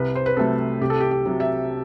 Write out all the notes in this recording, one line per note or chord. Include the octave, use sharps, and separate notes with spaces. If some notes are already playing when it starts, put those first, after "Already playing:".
Already playing: C2 B4
C5
B4
C3 F#3 A3 A4
C2 G4
A4
G4
G4
C3 F#3
E5